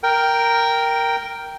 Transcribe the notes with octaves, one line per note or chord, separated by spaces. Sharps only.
A#4 G5